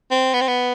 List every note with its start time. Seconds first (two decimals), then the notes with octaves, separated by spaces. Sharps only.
0.11 C4
0.34 B3
0.41 C4
0.48 B3